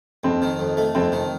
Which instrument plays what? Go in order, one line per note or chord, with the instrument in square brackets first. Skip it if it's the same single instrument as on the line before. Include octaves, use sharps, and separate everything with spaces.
[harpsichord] F2 [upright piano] C4
[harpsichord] D#3
F2
A3
[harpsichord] F2 [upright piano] C4
[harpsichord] D#3